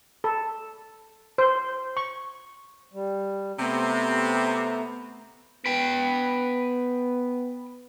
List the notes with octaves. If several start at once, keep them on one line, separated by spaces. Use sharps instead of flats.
A4
C5
C#6
G3
C3 A3 B3 A#5
B3 B4 G5